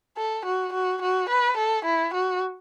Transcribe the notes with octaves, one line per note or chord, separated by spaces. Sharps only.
A4
F#4
F#4
F#4
B4
A4
E4
F#4